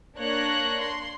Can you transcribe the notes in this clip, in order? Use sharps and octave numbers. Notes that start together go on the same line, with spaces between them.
A#3 D4 C#5 F#6 A#6
C6